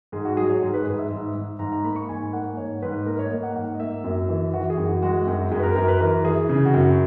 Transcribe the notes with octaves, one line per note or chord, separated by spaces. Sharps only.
G#2 G#4
F#4
F#3 G#4
C#5
G#2 G#4
B4
G#2 G#4
E5
G#2
G#2
G#2 A#5
A#5
A#3 B5
C#6
G#2 G#5
A#3 F#5
G#2 C#5
G#2 B4
A#3 A#4
C#5
A#3 D#5
F#5
G#2 F#5
D#5
A#3 E5
F#2
E3
E3 F#4
G#4
F#2
F#4
G#3 F#4
F#2
F#2 G#4
B4
A#4
F#2 A#4
B4
E3 A#4
E3 G#4
C#3 G#4
F#4
F#2
F#4